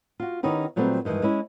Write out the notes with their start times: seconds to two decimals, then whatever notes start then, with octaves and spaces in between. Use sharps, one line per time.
0.20 F4 F#4
0.43 D#3 B3 C#4 D#4 E4 G4
0.76 A#2 F#3 G3 A3 B3 C4
1.05 G2 D#3 E3 G#3
1.22 G#3 C#4 E4